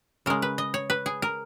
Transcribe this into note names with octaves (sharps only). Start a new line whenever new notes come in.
C#3 G#3 A#4
B4
D#5
C#5
B4
G#4
A#4